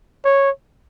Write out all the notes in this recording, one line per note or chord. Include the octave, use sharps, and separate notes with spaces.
C#5